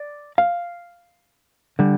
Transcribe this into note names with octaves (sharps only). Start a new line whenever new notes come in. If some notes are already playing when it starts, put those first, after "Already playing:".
Already playing: D5
F5
D3 G3